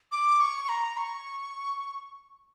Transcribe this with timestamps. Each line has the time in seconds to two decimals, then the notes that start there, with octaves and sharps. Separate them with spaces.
0.12 D6
0.41 C#6
0.65 C#6
0.69 A#5
0.97 C#6